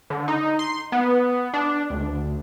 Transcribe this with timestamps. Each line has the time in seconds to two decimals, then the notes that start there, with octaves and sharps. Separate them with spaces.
0.10 D3
0.28 D#4
0.59 C6
0.92 B3
1.54 D4
1.90 D2